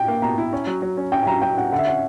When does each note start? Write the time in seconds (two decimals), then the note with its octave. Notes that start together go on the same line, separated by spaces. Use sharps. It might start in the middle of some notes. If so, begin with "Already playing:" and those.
Already playing: G5
0.08 A#3
0.22 B2 A#5
0.38 E4
0.53 C#4
0.67 F#3
0.82 F#3
0.97 C#4
1.12 C#4 G5
1.23 G5
1.27 F#3 A#5
1.42 F#3 G5
1.57 C#4 F#5
1.72 D3 F#5
1.79 E5
1.87 C#4 F#5